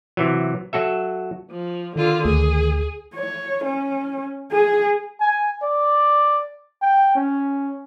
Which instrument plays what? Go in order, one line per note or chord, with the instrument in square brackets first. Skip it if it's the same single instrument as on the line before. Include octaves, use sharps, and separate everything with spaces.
[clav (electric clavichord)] C3 E3 F#3
F#3 F#4 A4 E5
[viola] F3
[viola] D3 F4 [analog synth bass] D#3
[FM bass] D2 [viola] G#4
[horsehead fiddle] C#5
C#4
G#4
[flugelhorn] G#5
D5
G5
C#4